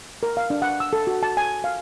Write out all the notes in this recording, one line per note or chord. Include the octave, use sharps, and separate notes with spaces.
A#4
F5
D4
F#5
E6
A4
F#4
A5
G#5
F5